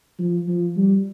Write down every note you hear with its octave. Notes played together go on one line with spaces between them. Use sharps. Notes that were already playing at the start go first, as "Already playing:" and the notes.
F3
F3
G3